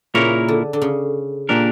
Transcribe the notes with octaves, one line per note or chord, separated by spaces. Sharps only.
A#2 C#3 A#3 E4 A#4 C#5
D3
D3
C#3
A#2 A#3 D4 G4 A#4